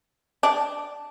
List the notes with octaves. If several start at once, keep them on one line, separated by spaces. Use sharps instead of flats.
D4